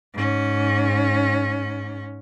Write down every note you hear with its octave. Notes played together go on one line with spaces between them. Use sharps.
G#2 C#4